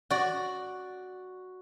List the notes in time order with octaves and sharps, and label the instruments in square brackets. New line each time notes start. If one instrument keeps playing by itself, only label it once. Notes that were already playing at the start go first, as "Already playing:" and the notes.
[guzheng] F#4 D5